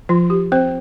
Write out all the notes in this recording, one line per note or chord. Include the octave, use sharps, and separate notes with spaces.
F3 F4
G4
C4 C5